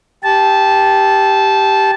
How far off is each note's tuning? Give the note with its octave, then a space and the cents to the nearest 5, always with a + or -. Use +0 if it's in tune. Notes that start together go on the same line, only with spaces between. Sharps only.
G4 +0 A5 -15